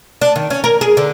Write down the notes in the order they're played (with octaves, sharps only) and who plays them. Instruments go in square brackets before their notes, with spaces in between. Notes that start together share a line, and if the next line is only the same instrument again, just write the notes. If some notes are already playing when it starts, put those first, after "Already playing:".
[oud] D4
D#3
C#4
A#4
G#4
D3